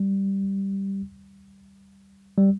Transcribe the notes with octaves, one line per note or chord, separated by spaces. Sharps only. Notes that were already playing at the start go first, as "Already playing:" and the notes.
Already playing: G3
G3